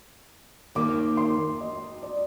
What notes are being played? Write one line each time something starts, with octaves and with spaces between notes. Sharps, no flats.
D#2 D#3 A#3 D6
C6
D#5
D5